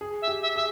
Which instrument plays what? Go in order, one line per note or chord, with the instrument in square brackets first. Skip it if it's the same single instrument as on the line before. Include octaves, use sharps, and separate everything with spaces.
[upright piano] G#4
[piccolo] E5
[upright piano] G4
[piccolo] E5
[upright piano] G#4 [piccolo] E5